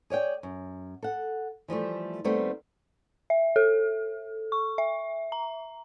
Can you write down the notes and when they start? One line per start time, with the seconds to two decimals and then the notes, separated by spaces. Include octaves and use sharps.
0.10 G#4 C#5 D5 G5
0.43 F#2
1.03 A4 F#5
1.68 E3 F3 G3 A3
2.24 D#2 G3 A3 B3 C4
3.30 E5
3.56 A4
4.52 C#6
4.78 E5
5.32 A#5